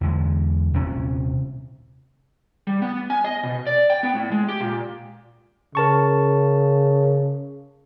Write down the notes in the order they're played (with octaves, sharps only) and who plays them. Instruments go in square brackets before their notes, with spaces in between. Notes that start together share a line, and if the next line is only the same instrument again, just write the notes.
[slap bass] E2 D3 G#3
D#1 C3 C4 C#4
[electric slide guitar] G3
B3
G#5
D#5
B2
D5
G5
B3
A2
G#3
G4
A#2
[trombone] C#3 [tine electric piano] A#4 A5 C#6